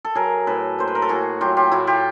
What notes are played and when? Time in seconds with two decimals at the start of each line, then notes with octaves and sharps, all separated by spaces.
0.05 A4
0.15 F#3 G#4 A#4
0.47 A2 A4 B4
0.79 A#3 C5
0.88 B4
0.95 A#4
1.02 A4
1.09 A2 F#4 G#4
1.41 F#3 F4 G4
1.57 F4 G4
1.72 A2 E4 F#4
1.87 F4 G4